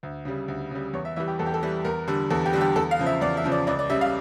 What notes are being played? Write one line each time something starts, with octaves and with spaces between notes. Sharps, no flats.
D2
C#3 G3
D2
C#3 G3
E2 C#5
E5
E3 G3 E5
G4
E2 A4
G4
A4
E3 G3
E2 A#4
D3 G3
E2 A4
G4
D3 G3
G4
E2 A4
F5
C#3 F3
E5
E2 D5
E5
C#3 F3
D5
C#2 D5
D5
C#3 G3 E5
F5